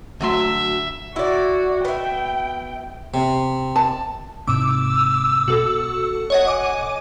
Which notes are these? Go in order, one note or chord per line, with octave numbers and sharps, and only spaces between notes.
D2 F#3 E5 C6
E4 F#4 D5
B3 E5 G5
C3
A5
G#2 C3 D6 E6
B2 F#4 A4
C#5 D#5 F#5
G#5 D6